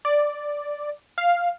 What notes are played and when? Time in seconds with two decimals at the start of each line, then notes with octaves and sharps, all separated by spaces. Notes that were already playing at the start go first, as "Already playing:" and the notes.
0.05 D5
1.18 F5